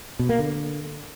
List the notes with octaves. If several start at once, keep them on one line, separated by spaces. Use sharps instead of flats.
B2
A#3
D3